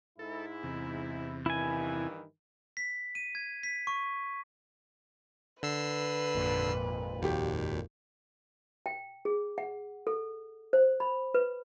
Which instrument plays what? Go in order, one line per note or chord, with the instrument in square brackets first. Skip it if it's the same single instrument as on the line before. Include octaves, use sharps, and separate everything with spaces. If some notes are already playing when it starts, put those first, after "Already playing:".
[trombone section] G#2 E4 [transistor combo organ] A4
[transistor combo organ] E2 C3
[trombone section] G2 D#3 E3 [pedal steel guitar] E4 G#5
[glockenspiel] B6
D#7
G#6
B6
C#6
[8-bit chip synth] D3 E6 C7 [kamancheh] B4
[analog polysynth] G#1 F2 A#2
[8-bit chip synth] D#2 [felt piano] F#4 G4
[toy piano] G5
G#4
F#5
A4
C5
B5
B4